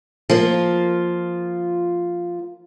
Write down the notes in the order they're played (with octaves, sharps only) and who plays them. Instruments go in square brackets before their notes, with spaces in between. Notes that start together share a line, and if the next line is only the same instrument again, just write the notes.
[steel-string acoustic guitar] F3 A#3 F4